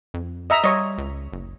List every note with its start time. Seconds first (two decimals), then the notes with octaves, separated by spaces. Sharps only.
0.14 F2
0.50 D#5 E5 A#5
0.64 G3 C#5 D#5
0.98 C#2
1.32 F#1